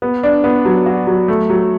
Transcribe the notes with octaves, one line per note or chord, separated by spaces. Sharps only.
B3
D4
B3
F#3
F#4
F#3
A3
F#3